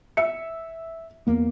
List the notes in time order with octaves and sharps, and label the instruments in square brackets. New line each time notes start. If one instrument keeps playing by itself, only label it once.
[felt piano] E5 C#7
[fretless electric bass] E2 A#3 B3